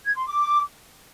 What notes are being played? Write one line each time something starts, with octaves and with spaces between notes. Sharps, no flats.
G#6
C6
D6